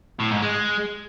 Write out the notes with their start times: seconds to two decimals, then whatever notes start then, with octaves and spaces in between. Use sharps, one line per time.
0.20 A2
0.31 G#2
0.42 G#3